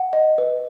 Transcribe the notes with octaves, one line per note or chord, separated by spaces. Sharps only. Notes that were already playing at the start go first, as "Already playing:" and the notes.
Already playing: F#5
D#5
B4